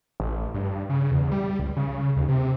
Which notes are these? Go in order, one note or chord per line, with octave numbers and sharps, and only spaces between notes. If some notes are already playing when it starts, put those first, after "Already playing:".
A1
G2
C#3
E2
G3
C#2
C#3
D#2
C3